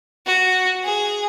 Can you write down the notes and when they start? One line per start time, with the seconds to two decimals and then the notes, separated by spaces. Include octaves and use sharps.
0.27 F#4
0.84 G#4